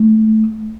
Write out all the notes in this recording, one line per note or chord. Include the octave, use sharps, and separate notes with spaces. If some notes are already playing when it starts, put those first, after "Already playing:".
Already playing: A3